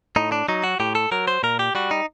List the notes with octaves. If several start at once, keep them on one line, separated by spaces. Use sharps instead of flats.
A2 D#4
D4
F#3 D#4
F#4
A2 G4
A4
F#3 A#4
C5
A#2 A#4
G4
G3 F#4
D#4